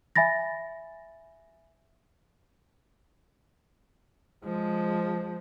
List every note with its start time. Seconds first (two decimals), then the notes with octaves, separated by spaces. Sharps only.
0.16 E5 G#5 B5 A6 A#6
4.44 F3 G#3